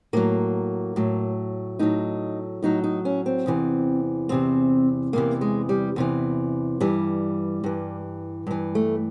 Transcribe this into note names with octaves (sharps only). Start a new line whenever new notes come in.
A2 F#3 A#3
A2 F#3
A2 F#3 D#4
A2 F#3 D#4
D#4
C#4
C4
E2 C3 E3
E2 C3 E3 C4
E2 C3 E3 A#3
G#3
G3
E2 C3 E3
G2 E3 G3
G2 E3
G2 E3
A3